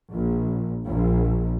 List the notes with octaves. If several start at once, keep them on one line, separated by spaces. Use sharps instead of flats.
A#1
A#1